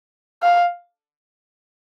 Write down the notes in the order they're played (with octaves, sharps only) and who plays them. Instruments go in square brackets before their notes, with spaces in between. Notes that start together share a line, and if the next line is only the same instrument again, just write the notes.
[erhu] F5